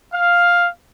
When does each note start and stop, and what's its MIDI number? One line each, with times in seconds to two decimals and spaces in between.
0.14 0.68 77